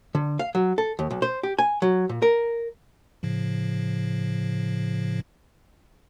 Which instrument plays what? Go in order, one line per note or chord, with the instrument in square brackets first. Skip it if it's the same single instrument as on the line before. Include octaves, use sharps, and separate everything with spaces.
[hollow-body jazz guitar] D3
F5
F#3
A4
D#2
B1
C5
G4
G#5
F#3
A#2
A#4
[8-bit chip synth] A2 C#3 F3